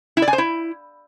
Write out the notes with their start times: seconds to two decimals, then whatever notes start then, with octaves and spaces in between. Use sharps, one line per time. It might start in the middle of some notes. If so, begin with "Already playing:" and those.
0.17 E4
0.22 D5
0.28 G#5
0.33 C5
0.38 E4